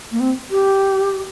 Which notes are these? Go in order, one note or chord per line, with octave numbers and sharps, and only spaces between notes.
A#3
C4
G4